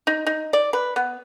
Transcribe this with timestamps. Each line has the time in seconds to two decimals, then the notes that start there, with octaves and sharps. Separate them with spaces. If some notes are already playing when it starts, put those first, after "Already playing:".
0.07 D#4
0.26 D#4
0.53 D5
0.73 B4
0.96 B3